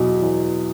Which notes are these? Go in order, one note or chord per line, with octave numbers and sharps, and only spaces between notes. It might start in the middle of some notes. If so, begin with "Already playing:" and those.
Already playing: E2 B2 F#3
E2